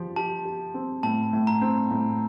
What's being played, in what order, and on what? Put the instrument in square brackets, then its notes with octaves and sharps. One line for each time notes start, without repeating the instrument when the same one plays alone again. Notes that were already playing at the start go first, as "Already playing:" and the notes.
Already playing: [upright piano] F3 G4
[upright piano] G4 [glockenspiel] A5
[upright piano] G4
C4
[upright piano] A2 [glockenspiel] A5
[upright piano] A2
[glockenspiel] A#5
[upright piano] C4
A2